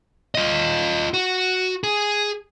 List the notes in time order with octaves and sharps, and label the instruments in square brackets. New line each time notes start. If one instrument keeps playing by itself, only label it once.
[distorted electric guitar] F4 D#5
F#4
G#4